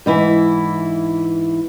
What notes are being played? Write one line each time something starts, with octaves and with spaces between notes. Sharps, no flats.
G#2 E3 E4